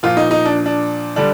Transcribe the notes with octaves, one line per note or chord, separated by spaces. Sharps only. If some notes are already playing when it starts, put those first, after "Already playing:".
A#2 F3 F4
D#4
D#4
D4
D4
D3 G3 D4